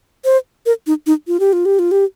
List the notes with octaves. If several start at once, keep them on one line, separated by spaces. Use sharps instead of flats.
C5
A#4
D#4
D#4
F4
G4
F4
G4
F4
G4